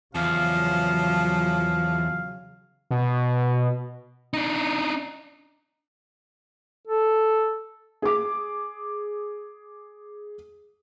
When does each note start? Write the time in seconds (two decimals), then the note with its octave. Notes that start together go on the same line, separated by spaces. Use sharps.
0.15 E2 C#3 F3 F#3 F5
2.91 B2
4.34 D4 D#4
6.88 A4
8.02 G#4 D6